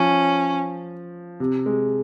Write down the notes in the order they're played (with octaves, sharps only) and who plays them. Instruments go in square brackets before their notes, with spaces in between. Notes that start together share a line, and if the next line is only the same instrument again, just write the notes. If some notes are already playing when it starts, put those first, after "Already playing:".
Already playing: [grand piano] F3 [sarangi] C#4
[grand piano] C3
G#3